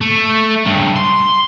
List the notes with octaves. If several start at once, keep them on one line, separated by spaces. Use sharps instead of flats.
A3
G2 C#3
C6